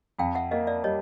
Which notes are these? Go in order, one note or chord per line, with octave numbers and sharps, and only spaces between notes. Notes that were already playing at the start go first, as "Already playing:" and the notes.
F2 F5 G5
E5 F#5
A#3 D#5 F5
D5 E5
G3 C#5 D#5